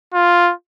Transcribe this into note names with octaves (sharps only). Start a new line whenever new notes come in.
F4